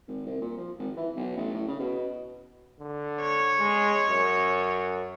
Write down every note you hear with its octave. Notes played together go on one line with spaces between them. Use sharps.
G#1
C2
A#2
F3
G#1
E3
B1
A1
A2
C#3
B2
D3
C#5
G#3
F#2